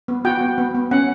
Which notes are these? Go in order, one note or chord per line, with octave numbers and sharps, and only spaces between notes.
B3
F#4 G5
B3
B3
B3
C#4 F#5